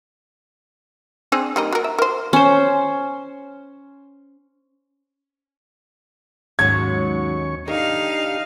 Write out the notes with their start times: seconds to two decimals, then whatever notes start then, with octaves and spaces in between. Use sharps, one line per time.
1.32 C4 D4 G#4
1.56 G3 A#3 D#4
1.72 F#4 A#4
1.84 E5
1.98 A#4 C5
2.33 C#4 C5
6.59 D#2 G#2 F#3 C#4 C#6 G#6
7.68 D4 D#4 G4 A#4 F5